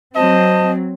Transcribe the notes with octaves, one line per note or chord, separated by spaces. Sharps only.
F#3 C4 C5 D#5 A5